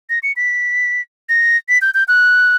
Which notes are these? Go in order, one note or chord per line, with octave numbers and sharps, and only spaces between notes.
A#6
C#7
B6
A#6
B6
G6
G6
F#6